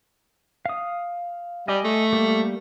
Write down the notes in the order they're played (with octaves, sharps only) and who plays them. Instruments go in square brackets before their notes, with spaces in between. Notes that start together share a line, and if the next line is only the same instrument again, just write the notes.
[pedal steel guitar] F5 D#6
[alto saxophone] G3 [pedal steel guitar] D#5 G#5 D6
[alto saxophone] A3
[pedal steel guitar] G3 A#3 G4